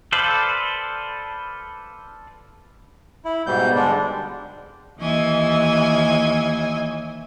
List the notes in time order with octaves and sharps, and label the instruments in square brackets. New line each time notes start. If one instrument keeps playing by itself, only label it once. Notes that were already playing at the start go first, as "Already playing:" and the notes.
[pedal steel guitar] A4 B4 C5 D5 F5
[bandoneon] E4
G#2 B2 G3 G6
D3 G3 G#3 D4
[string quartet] D#2 E3 D#5 G#5 E6